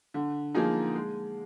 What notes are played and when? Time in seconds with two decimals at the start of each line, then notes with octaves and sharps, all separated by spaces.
0.14 D3
0.54 F3 A#3 D#4 G#4
0.95 G#3